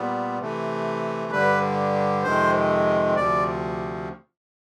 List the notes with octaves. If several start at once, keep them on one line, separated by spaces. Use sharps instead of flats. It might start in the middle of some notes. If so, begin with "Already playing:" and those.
Already playing: A#2 G3 B3
C3 E3 A3
G2 D3 G3 B4
F2 C3 D#3 G#3 C5
D2 C3 F3 D5